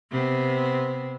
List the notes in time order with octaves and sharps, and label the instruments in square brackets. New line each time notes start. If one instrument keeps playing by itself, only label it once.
[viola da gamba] C3 B3 C4